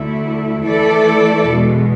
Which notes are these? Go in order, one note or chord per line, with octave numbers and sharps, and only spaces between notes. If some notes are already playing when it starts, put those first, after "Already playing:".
Already playing: D2 D3 A3 E4
E3 A3 E4 A4 D5
E2 B2 G#3